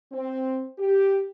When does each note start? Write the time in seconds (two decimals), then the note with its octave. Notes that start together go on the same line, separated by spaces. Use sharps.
0.11 C4
0.78 G4